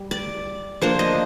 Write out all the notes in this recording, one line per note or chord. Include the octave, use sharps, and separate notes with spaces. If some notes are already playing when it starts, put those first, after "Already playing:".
Already playing: G3
D5
F3 A#3 D4 C5
D#5